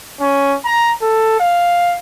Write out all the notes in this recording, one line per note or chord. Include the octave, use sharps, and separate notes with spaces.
C#4
A#5
A4
F5